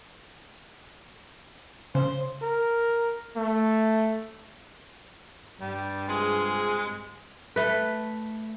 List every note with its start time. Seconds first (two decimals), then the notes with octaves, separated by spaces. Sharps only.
1.95 C#3 C5
2.42 A#4
3.37 A3
5.60 G2 G3
6.09 C3 G#3 F4 G#4
7.56 A3 B4